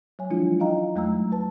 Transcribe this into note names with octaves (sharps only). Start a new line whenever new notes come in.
F#3 C#5 G#5
E3 F3 G#3 D4 E4 F4
D#4 D#5 F5 G5 A#5
F2 F#3 G#3 A3 A#5 E6
B4 A5